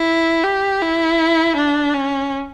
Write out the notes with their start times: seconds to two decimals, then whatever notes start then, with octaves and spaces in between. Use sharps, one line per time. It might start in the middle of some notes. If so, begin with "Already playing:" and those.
Already playing: E4
0.43 G4
0.82 E4
1.56 D4
1.94 C#4